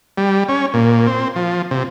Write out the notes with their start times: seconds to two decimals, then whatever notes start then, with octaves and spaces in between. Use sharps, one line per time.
0.17 G3
0.49 C#4
0.74 A#2
1.07 C4
1.36 F3
1.71 C3